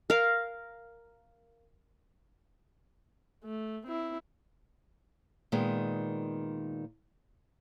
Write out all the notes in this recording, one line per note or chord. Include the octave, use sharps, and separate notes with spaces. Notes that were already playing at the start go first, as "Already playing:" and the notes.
A#4 F5
A3
C4 E4
A#2 D#3 G#3 B3